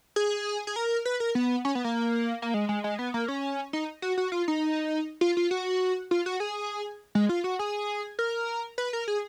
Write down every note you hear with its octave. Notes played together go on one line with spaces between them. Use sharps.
G#4
G#4
A#4
B4
A#4
B3
C#4
B3
A#3
A#3
G#3
G#3
G#3
B3
A#3
C#4
D#4
F#4
F#4
F4
D#4
F4
F4
F#4
F4
F#4
G#4
G#3
F4
F#4
G#4
A#4
B4
A#4
G#4